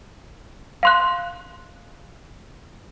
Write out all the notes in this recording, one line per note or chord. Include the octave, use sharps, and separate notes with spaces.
F5 C6 F#6